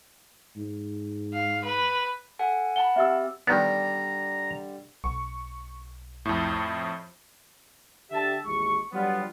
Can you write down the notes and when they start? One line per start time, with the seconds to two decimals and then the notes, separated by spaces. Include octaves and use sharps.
0.56 G#2
1.33 F5
1.64 B4
2.39 A4 F#5 G#5
2.76 F#5 A5 B5 G7
2.96 C4 G4 E5 E6
3.47 D3 D#3 G3 B3 A#5
5.04 B1 C#6
6.25 F2 A2
8.11 D3 G4 E5 A5
8.45 A1 D#2 G#3 C#6
8.92 D3 F#3 G3 B3 F4